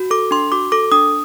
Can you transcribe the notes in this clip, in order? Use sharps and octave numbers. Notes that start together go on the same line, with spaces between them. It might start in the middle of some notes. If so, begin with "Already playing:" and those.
Already playing: F#4
A4 D6
D4 C6
F#4 D6
A4 D6
D4 D#6